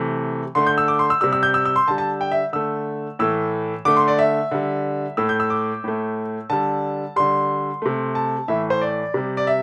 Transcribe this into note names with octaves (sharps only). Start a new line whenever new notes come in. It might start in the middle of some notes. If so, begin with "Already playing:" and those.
Already playing: C3 E3 A3
D3 A3 C6
G6
E6
D6
C6
E6
C3 G3 E6
E6
G6
E6
E6
C6
D3 G3 A5
A5
G5
E5
D3 A3 E6
A2 E3 A3 E6
D3 A3 D6
C6
D5
E5
D3 G3
A2 A3 E6
G6
E6
D6
A2 A3
D3 G3 A5
D3 G3 C6
C3 A3
A5
A2 E3 A3 E5
C5
D5
C3 G3
D5
E5